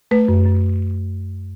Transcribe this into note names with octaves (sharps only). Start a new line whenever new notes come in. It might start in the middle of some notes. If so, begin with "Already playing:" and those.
A3 B4
F#2
F#2